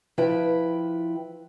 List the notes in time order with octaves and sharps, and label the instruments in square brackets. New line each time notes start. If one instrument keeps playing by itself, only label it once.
[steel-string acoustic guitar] F3 E4 B4 G5